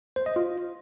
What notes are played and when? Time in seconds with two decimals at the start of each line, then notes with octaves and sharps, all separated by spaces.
0.16 C5
0.26 D#5
0.36 F4